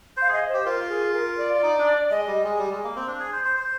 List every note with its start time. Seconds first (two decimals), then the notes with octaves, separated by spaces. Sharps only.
0.17 C5 F5
0.29 G#4 D#5
0.49 G4 C5
0.65 F4 A#4
0.89 G#4
1.14 A#4
1.38 D5
1.54 F4
1.63 D#4
1.79 D4
2.10 G#3 D#5
2.27 G3
2.44 G#3
2.59 G3
2.72 G#3
2.84 A#3
2.96 C4
3.08 D4
3.20 G#4
3.33 C5
3.45 C5
3.57 C5